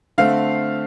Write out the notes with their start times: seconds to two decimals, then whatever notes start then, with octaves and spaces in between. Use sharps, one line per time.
0.18 D3 A3 C4 F5